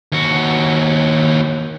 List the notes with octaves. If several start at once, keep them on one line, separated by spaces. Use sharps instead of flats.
D#2 F#4